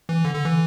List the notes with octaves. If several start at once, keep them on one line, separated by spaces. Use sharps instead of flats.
E3
D3
D3
E3